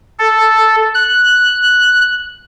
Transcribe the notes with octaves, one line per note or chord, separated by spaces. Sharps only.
A4
F#6